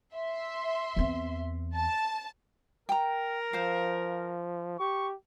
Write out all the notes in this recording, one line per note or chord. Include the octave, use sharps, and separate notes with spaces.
E5 C6
E2 C4
A5
A#4 G5 A#5
F3 C5 F5
G4 C#6